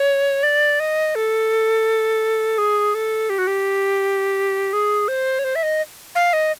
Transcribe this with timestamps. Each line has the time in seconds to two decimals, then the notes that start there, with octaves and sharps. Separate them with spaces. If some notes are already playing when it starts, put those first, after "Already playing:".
Already playing: C#5
0.43 D5
0.80 D#5
1.15 A4
2.58 G#4
2.95 A4
3.30 G4
3.38 F#4
3.47 G4
4.73 G#4
5.08 C5
5.39 C#5
5.44 C5
5.55 E5
5.63 D#5
6.15 F5
6.33 D#5